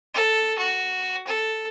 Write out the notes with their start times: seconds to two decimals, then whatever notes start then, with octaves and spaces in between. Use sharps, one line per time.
0.14 A4
0.58 F#4
1.27 A4